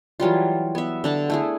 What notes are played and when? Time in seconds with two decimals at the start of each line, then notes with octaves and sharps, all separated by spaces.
0.20 E3 F#3 G3 F4
0.75 B3 E5
1.04 D3 D4 A5
1.30 A3 E4 G#4